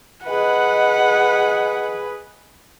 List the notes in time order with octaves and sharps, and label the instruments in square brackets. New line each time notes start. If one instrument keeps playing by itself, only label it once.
[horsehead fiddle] G#4 B4 [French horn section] D#5 [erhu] F#5